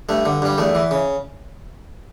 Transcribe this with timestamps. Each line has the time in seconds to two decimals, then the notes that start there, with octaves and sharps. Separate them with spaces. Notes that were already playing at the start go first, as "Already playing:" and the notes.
0.09 G2 A3
0.25 D3
0.42 G2 G3
0.58 E2 A3
0.75 E3
0.91 C#3